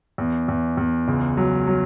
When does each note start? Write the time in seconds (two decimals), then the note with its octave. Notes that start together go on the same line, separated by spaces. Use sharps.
0.18 E2
0.48 E2
0.77 E2
1.08 C#2
1.37 F#3
1.67 F#3